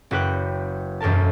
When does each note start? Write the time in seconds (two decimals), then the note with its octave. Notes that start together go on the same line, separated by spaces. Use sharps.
0.11 F#1 F#4 B4 G5 F#6
1.01 E1 F#2 A4 A#4 A5